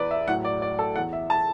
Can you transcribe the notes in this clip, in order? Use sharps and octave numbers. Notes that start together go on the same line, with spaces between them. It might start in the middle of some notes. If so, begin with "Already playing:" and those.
Already playing: E2 E3 B4 D5
E5
A2 F#3 F#5
D5
D5
A4
E2 E3 F#5
E5
A5